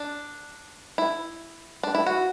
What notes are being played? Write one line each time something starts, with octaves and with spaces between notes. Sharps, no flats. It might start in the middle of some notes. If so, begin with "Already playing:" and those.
Already playing: D4
E4
D4
E4
F#4